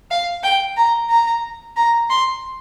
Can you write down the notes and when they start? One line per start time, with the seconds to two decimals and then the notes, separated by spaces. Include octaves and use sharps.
0.11 F5
0.43 G5
0.77 A#5
1.09 A#5
1.76 A#5
2.10 C6